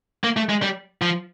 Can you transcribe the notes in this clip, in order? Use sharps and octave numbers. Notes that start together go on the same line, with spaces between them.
A#3
A3
G#3
G3
F3